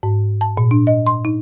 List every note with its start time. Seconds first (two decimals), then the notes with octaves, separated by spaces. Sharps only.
0.03 G#2
0.41 A5
0.57 A#2
0.71 D4
0.87 D#5
1.07 C6
1.25 D#4